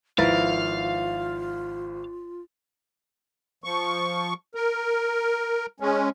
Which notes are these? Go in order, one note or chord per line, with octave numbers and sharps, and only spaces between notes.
G#1 F3 E4 F4 A#4 B4 F5 A6
F3 C#6
A#4
G#3 C#4